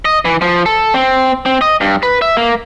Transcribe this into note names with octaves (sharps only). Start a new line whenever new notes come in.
D#5
E3
F3
A4
C4
C4
D#5
G2
B4
E5
A#3